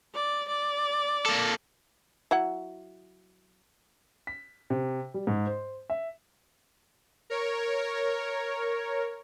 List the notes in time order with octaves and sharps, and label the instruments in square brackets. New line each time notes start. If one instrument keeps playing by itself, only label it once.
[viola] D5
D5
[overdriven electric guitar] A#3 A4
[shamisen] F#3 E4 F#5
[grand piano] B6
C3
G3
G#2
C5
E5
[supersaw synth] A#4 C#5